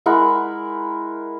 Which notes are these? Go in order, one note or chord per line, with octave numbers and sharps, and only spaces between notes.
G#3 E4 A#4 F#5